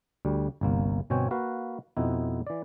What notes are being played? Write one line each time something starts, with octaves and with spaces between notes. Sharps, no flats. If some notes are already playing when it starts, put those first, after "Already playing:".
D2 G3
G1 C2 A#3
G1 B2 C4 C#5 G5 G#5
A#3 F#4 B4 F5
F2 B2 B3 C4 D#4 E4
E3 D5